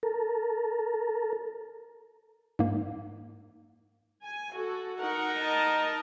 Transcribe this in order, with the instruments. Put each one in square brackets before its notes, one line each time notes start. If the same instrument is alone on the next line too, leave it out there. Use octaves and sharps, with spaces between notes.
[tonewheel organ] A4 A#4
[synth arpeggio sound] G#2 A#3
[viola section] G#5
F#4 A4
[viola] D#4 A#4 [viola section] F#5
[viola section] D#5 A5